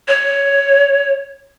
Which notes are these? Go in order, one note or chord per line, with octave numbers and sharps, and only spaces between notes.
C#5